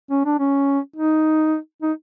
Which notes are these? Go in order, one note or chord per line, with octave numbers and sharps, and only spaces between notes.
C#4
D4
C#4
D#4
D#4